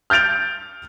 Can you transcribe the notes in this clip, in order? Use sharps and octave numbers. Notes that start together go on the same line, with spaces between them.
F6 G6 A6 D7 F7